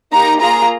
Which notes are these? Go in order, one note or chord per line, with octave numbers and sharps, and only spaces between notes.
A#3 D#4 G4 A#5
A#3 F4 G#4 A#5